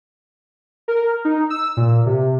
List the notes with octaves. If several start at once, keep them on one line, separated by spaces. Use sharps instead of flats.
A#4
D#4
E6
A#2
C3